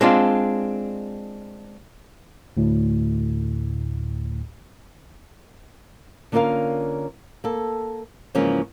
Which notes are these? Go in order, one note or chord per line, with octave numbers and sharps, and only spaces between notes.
G#3 C4 D4 F4
D2 A2
D3 A#3 C#4 F4 A#4 F5
A#3 A4
G#2 C#3 E3 F3 A#3 C#4